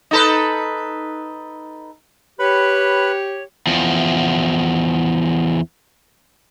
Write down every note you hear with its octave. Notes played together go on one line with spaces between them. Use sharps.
D#4 A4 B4
G4 B4 C#5 B5
E2 F3